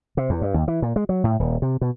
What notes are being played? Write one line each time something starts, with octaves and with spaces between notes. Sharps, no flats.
C3
E2
G2
D#2
E3
A#2
G#3
F#3
A2
D#1
C3
B2